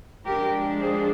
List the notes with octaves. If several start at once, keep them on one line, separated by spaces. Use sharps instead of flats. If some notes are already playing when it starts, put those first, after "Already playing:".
F3 G#3 D4 G4 A#4
G#4 C5